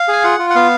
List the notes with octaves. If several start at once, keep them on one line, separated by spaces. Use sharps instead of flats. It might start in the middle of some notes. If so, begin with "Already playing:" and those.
Already playing: F5
G#4 G#5
F4 F#5
F4
F#5
B3 F5